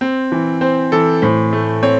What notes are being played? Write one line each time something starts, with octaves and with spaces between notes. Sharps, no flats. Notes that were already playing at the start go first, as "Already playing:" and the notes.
C4
E3
C4 C5
E3 A4
A2 C5
A3
C4 C#5